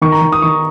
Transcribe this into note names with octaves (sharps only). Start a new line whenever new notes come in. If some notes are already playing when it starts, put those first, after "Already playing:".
D#3 C#6
A#5
D#3
D#6
D#3 C#6